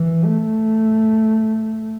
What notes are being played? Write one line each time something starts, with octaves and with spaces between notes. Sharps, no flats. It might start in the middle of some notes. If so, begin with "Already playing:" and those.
Already playing: E3
A3